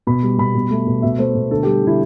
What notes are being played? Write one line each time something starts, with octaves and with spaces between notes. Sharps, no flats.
B2 B5
G3
B2 B5
B2
A3
B2
B2 E5
A3 C5
B2
D3 A4
G3 G4
D3 E4